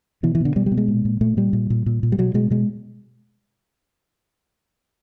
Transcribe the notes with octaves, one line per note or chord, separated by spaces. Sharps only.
B2 E3
E3
B2 D3
B2 G3
G3
B2
G#3
A#2
A#2
A#2 A3
A#2 G3
A#2
A#2
A#2
A#2
G3
B2 F#3
B2 G#3
B2 G#3